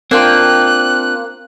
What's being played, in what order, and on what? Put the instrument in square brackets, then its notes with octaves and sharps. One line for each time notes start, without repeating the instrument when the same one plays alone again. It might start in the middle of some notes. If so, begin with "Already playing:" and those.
[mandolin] A#3 G5 [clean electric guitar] C4 D4 F4 [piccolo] F#6